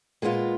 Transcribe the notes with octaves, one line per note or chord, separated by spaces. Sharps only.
A#2 G#3 B3 F4